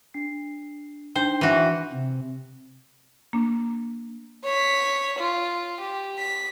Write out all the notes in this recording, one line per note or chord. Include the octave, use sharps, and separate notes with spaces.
D4 C7
D4 D#4 C5 G5
E3 F#4
C3
A#3 D4
C#5 B6
F4
G4
B6